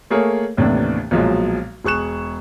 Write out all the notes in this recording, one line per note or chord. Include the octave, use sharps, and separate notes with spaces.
A3 A#3 G#4 A#4 C#5
D#2 A2 C3 E3 B3 D4
B1 A#2 F3 F#3 G#3
E1 G#4 C#6 F#6 E7